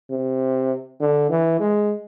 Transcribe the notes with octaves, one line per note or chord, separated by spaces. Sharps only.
C3
D3
E3
G#3